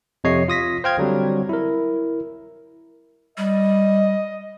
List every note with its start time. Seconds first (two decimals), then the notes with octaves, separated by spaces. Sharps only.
0.24 F2 C3 C#5 D#5 C7
0.48 F4 D#6 A#6 B6
0.84 C5 F5 G5 F6 G#6
0.98 D3 F#3 G3 C4
1.49 E4 A#4
3.38 G3 D#5